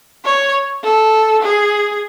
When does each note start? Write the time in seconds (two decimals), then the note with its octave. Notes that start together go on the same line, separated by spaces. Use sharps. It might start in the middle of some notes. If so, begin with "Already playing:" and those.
0.25 C#5
0.83 A4
1.42 G#4